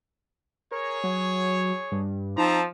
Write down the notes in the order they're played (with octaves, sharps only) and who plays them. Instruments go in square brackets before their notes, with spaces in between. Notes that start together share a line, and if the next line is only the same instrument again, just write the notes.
[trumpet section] G#4 C#5 [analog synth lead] A#4
[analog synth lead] F#3
G2
[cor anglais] F3 [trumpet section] C4 A5 A#5 [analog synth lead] D#4